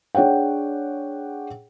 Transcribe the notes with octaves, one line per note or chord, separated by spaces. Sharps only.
D4 G#4 C#5 F#5 G5